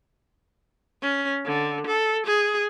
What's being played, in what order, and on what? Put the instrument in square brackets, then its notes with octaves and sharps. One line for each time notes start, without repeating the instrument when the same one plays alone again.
[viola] C#4
D3
A4
G#4